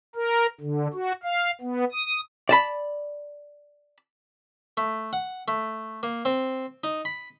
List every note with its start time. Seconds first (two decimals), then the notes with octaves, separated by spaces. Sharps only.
0.15 A#4
0.60 D3
0.93 F#4
1.24 F5
1.61 B3
1.92 D#6
2.49 D5 A5 B5
4.77 A3
5.13 F#5
5.48 A3
6.03 A#3
6.25 C4
6.84 D#4
7.05 B5